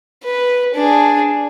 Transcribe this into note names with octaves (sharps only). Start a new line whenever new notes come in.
B4
D4 G#4